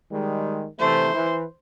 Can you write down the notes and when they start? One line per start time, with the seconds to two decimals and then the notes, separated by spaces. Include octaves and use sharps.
0.11 D#3 G3 G#3
0.79 C3 E3 A3 C5
1.14 E3